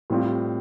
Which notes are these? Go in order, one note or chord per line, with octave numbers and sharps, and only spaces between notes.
A2 G3 C4 F4